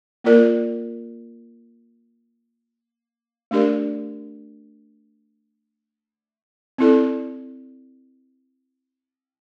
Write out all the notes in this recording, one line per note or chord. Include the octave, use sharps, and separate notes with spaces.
A#3 F4 A#4 D5
A3 D4 G4 A#4 D5
C4 E4 A4 D5